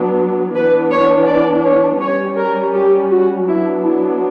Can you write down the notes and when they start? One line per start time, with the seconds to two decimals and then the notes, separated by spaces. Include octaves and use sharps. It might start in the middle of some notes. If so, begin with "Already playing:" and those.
Already playing: F#3 B3 D4
0.55 E3 B3 D4 B4
0.91 C#5
1.27 D5
1.64 C#5
2.01 G3 C#4 C#5
2.37 A#4
2.74 G4
3.11 F#4
3.47 F#3 B3 D4 E4
3.84 E4